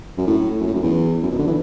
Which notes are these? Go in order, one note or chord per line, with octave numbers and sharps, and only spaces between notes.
F#2
A2
F#2
A2
F#2
E2
F#2
B2
D3
E3